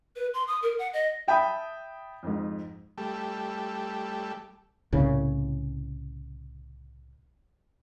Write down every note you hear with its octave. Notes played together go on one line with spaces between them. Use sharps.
B4
C6
D#6
A#4
F#5
D#5
E5 G5 A5 B5 D#6
F2 G#2
G3 A3
C2 A2 C#3